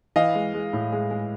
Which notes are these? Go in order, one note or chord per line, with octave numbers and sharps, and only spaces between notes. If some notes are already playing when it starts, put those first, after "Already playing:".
E3 D#5 F5
G#3
G#3
A2
G#3
G#3